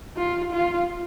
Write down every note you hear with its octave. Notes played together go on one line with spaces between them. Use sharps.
F4
F4